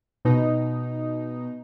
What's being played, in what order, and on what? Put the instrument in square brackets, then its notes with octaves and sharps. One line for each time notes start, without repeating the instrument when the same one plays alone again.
[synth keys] B2 D#4